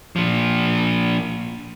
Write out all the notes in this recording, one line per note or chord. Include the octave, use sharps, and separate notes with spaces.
A#2 F3